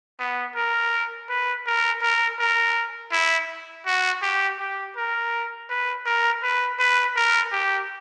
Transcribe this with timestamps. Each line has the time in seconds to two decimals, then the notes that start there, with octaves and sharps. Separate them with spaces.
0.20 B3
0.55 A#4
1.29 B4
1.66 A#4
2.02 A#4
2.39 A#4
3.12 E4
3.86 F#4
4.22 G4
4.59 G4
4.96 A#4
5.70 B4
6.06 A#4
6.43 B4
6.79 B4
7.16 A#4
7.52 G4